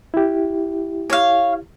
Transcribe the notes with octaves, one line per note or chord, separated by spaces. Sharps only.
E4 G4
C#5 F5